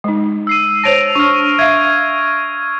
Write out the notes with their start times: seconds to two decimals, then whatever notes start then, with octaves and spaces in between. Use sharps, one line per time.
0.04 G#3 D#4
0.47 E6 C7 D#7
0.84 C5 C#5 A5 A#6 D7 F7
1.15 D4 C#6 F6
1.59 E5 F5 G#6